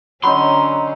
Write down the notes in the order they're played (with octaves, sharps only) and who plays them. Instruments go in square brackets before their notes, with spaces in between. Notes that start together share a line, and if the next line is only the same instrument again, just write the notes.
[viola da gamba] D3 C#4 [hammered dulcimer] F#3 D#4 [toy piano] B5 [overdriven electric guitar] C6